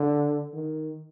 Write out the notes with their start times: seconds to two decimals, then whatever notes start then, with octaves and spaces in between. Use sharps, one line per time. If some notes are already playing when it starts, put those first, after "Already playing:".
Already playing: D3
0.54 D#3